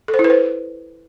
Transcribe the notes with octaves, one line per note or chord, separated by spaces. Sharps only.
A4
C5
E4
B4
C5